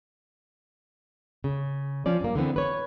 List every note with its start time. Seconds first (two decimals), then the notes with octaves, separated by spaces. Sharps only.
1.44 C#3
2.06 F3 C#4 D5
2.21 G2 A#3
2.35 D3 E3 B3 C4
2.56 B4 C#5